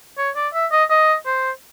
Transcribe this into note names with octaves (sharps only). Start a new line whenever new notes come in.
C#5
D5
E5
D#5
D#5
C5